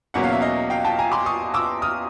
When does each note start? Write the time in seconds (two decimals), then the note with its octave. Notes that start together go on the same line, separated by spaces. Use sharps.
0.14 E2 B2 F#3 A#3 C#4 F#5
0.23 F5
0.32 E5
0.41 D#5 F5
0.70 F5 G5
0.85 G5 A5
0.99 G#5 A#5
1.12 C6 D6
1.26 C#6 D#6
1.54 D6 E6
1.82 D#6 F6